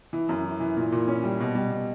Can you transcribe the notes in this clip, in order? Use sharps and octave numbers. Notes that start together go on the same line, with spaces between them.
E3
F#2
E3
E3
A#2
A#2
C#4
G3
B2
G3
B2